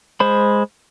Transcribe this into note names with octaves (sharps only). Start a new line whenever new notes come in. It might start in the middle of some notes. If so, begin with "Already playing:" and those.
G#3 C5 B5